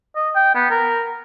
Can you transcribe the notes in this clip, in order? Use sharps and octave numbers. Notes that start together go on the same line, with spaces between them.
D#5
G5
B3
A#4